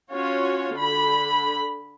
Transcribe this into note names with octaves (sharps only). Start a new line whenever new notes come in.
C#4 F4 F#4 C#5
D3 B5